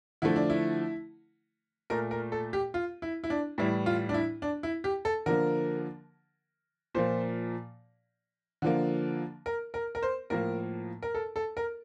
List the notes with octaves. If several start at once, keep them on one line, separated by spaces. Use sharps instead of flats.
D3 F3 A3 E4
D4
E4
A#2 A3 A#4
A#4
A4
G4
F4
E4
E4
D4
A2 E3 G3 E4
F4
D4
E4
D4
E4
G4
A4
D3 F3 A#3 A#4
A#2 F3 A#3 C5
D3 F3 A#3
A#4
A#4
A#4
C5
A2 F3 A#3 A#4
A#4
A4
A4
A#4